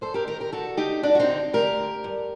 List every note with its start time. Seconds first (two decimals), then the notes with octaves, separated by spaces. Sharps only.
0.01 F#2 A4 C5
0.14 G4 A#4
0.27 D#3 G4 A#4
0.40 G4 A#4
0.52 D2 F#4 A4
0.77 D3 D#4 G4
1.03 D2 D4 F#4
1.15 F#4
1.19 C4 D#4
1.29 D3
1.53 D2 G4 A#4
1.79 D3
2.04 G2